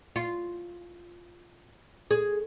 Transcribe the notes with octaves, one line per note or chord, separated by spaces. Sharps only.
F4
G#4